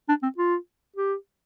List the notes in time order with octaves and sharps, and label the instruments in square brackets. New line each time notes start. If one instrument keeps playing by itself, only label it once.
[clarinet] D4
C4
F4
G4